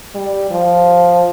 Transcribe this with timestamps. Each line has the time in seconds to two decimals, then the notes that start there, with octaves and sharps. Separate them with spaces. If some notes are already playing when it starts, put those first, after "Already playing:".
0.15 G3
0.51 F3